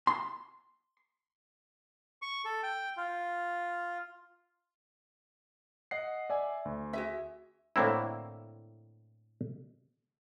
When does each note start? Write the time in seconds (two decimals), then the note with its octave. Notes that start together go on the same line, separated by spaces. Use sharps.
0.07 C6
2.22 C#6
2.45 A4
2.63 G5
2.97 F4
5.91 D#5 F#5 C7
6.30 D5 E5 G#5
6.65 D2
6.93 F#4 G#4 E5
7.76 A2 D3 A#3 C4 E4